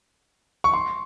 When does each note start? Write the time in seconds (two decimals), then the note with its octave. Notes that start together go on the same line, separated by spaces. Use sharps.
0.64 C#6
0.74 C6